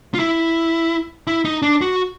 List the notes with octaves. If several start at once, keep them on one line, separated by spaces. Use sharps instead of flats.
F4
E4
E4
D#4
D4
F#4